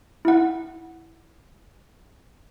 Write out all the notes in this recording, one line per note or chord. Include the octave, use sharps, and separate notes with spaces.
E4 F#5